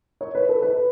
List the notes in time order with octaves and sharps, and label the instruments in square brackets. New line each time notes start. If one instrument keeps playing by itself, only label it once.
[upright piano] C#5
B4
A4
B4